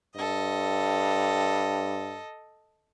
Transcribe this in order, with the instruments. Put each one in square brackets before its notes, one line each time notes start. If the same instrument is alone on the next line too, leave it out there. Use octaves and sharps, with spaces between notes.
[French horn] G2 [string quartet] A4 D#5